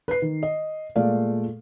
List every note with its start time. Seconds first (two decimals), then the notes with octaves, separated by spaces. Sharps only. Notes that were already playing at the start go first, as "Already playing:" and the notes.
0.08 B4 C7
0.22 D#3
0.43 D#5
0.96 A#2 G#3 A3 D5 F5